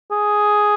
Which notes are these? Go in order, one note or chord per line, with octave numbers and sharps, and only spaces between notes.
G#4